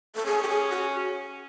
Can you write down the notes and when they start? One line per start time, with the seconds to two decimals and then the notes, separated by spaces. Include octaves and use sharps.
0.15 A4
0.25 C#4 G#4
0.43 G4
0.48 G#4
0.70 F#4